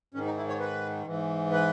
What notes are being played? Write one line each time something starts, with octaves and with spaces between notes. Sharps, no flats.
G#2 D#3 C#4
D#4
E4
C#5
B4
G#2 E3
B4